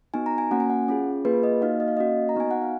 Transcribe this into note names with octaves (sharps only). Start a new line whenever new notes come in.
B3 D#4 F#4 G#5
A#5
G#5
A#3 C#4 F#4 F#5
G#5
F#5
C#4 F4 G#4
A#3 F4 G#4 B4
D#5
A#3 D#4 F#4 F5
D#5
F5
A#3 C#4 F#4 D#5
A#5
B3 D#4 F#4 G#5
F#5
F5